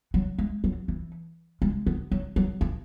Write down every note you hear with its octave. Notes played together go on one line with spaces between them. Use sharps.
F#3
G#3
F#3
E3
G#3
B3
F#3
F#3
E3